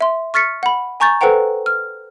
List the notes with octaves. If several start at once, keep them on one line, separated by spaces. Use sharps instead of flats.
E5 C6
C#6 F6 A6 B6 C#7
F#5 B5
G#5 A#5 C#6 G6 A6
A4 B4 C5 F#5 G5 A#5
F6